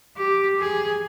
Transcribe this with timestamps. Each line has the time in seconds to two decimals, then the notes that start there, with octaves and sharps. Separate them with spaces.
0.17 G4
0.59 G#4